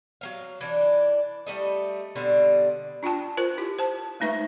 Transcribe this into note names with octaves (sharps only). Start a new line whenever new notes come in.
F#3 A#3 F5
E3 D4
G3 A3 D#5
B2 D3 G3 C4
D4 F4 D5 G5 A5
F4 A#4 C5
E4 F4 G4
C5 A5
G#3 A3 D#4 B4 E5 C#6